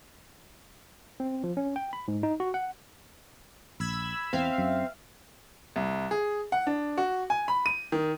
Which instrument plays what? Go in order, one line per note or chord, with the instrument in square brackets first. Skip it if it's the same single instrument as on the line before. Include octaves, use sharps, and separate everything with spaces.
[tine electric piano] C4
F3
C#4
G5
B5
G#2
D#4
F#4
F#5
[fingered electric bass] A#1 [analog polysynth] B5 E6 G#6
[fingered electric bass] E2 [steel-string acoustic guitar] C4 [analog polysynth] E5 F5
[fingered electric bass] F#2
[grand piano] C2
G#4
F#5
D4
F#4
G#5
B5
D#7
D#3